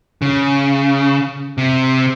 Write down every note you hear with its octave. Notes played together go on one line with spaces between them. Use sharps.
C#3
C3